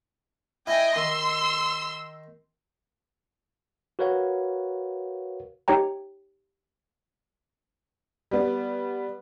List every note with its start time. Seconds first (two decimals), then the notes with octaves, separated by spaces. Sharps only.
0.67 E4 D#5 G5 G#5
0.96 D#3 C6 E6
3.99 F#4 A#4 B4 C#5 F5 F#5
5.68 D#4 G4 C#5 G5 A#5
8.31 G3 B3